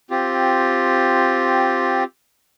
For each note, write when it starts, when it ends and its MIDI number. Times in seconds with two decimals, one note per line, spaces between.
0.10 2.04 60
0.10 2.04 65
0.10 2.04 67